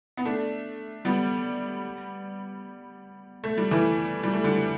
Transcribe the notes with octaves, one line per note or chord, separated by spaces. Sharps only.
B3
A3 D4
G3 B3
A3
G3
E3 A3
G3
A3
D3 G3